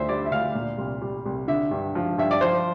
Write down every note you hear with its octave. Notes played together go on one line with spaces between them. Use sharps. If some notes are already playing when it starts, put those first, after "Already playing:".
Already playing: D2 D3 C5 E5
G3 D5
E5
D2 F5
A#2
C2
G3
C2
D3 E5
G2
F3
G2 E5
D5
F3 C5